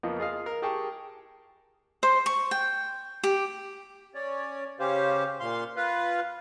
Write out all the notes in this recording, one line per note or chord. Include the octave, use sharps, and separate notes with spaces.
F2 F3 A#3 B3 D#5
F4 G#4 D#5 F5
A#4
G4 G#4 A#4 G5 A5 C#6
C5
C#6
G5
G4
C#4 C#5 D5
C#3 C#4 G4 C5 F5
A#2 F5 C6
F4 B4 F5